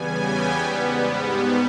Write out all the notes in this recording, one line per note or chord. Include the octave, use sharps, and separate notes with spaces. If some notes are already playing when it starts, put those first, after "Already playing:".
Already playing: E2 C#3 G3 B3 G#5
G5
G#2 G3 B3